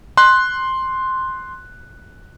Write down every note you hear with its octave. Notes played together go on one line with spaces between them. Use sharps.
C6 F#6